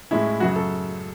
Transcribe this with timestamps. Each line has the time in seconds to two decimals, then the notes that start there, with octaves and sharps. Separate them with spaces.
0.11 A2 G#3 C#4 E4
0.40 F#2 C#3 F#3 F#4
0.56 A4